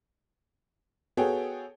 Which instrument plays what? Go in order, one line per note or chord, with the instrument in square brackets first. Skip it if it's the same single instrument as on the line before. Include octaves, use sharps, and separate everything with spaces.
[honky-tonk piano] B3 F#4 G#4 A4 C#5 G5